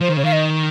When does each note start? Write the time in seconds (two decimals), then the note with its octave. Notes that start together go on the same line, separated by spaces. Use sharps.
0.01 F3 C5
0.08 D#3
0.17 C#3 C#5
0.24 D#3 F5
0.33 D#5